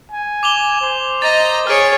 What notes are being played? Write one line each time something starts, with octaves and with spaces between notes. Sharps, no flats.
G#5
D6 F7 G7
C5
D#5 A#5 A6
G#4 C#5 F6 D7